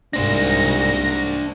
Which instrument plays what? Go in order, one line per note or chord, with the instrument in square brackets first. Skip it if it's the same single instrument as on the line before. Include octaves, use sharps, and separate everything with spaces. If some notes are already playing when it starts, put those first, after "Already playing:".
[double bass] C2 G#2 [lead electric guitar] D4 C5 [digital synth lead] A#6